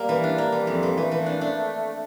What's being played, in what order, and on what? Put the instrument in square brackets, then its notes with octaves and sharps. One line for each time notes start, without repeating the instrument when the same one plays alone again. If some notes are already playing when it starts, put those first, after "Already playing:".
Already playing: [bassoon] G3 [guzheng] A#3
[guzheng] E3
D4
A#3
E3
F2
E3
[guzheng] E3 [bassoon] A3
[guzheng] E3
D4
D4